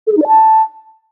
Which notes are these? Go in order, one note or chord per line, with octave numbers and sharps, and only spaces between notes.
A4
G#4
D#4
D5
A5